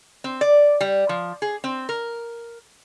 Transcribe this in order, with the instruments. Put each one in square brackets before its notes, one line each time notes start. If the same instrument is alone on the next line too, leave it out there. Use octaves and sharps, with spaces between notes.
[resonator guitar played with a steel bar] C4
D5
G3
F3
G#4
C4
A#4